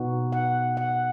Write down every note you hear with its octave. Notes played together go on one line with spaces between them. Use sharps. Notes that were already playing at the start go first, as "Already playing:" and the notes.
Already playing: B2 B3 D#4 F#4
F#5
F#5